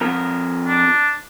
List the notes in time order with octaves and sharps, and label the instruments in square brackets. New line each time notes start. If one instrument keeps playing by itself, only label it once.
[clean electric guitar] F2 A#4
[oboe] D4